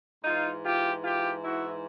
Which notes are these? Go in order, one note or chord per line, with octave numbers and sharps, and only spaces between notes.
G#2 E3 D#4 F4
F4 G4
F4 G4
E4 F#4